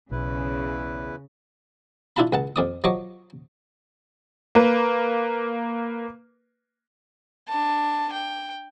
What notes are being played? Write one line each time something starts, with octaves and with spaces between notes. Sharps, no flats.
B1 E2 C#3 E4 B4
D4 E4 F4 A5 B5
C#2 F#5 A5
F2 D5 D#6
F3 F#3 C#5 D#5 C#6 D6
A#3 B4
D4 A5
G5